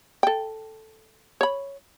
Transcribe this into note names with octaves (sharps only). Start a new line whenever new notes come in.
A4 G5
C#5 B5